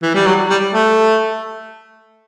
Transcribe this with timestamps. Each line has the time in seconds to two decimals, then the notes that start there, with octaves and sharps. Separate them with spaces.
0.02 E3
0.15 G3
0.26 F#3
0.50 G3
0.74 A3